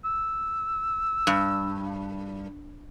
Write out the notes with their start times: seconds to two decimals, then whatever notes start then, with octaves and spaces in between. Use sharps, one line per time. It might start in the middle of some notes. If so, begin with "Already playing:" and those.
0.05 E6
1.27 G2